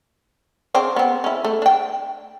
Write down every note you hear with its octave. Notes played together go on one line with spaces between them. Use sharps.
C#3 C4 D4
B3 C4
C#4 E4
A3
D4 G5